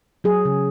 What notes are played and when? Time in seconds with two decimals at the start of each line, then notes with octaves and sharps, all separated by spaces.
0.24 F#3 G#4
0.45 C#3